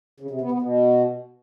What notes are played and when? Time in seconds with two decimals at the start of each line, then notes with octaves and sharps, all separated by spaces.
0.20 C#3
0.31 C3
0.41 B3
0.52 B3
0.62 B2